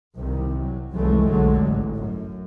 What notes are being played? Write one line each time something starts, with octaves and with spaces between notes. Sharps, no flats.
C2 C3 D#3
F#3
F1 C2 E3 F#3 G#3 A3
F1 B1 D3 F#3 G#3
A1
F#2